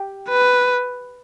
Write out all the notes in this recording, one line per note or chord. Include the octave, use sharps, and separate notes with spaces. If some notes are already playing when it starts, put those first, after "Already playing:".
Already playing: G4 G5
B4